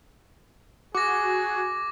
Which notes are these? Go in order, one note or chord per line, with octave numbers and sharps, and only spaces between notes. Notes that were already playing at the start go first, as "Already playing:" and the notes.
F#4 G#4 D6 A#6